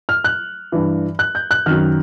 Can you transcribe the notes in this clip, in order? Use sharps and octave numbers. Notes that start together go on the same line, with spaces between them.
F6
F#6
G2 E3
F#6
G6
F#6
F#2 D#3 F6